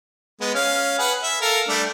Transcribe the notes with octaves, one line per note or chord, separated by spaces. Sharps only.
G#3 B3
C#4 F5
G#4 B4 F#5
E5
A4 A#4 F5
G3 A3 D4